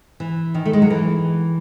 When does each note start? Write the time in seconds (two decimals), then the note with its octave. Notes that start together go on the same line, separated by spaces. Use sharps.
0.20 E3
0.54 D#3
0.66 A3
0.73 G#3
0.82 F#3
0.90 E3